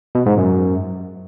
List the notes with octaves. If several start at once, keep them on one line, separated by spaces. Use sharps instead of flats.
B2
G#2
F#2